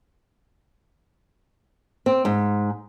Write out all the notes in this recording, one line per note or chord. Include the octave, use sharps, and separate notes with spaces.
C4
G#2